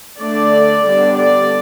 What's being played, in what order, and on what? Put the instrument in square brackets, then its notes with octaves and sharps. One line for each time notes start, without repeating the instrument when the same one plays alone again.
[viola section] D3 A3 D4 D5
D3 G3 B3 D4
D5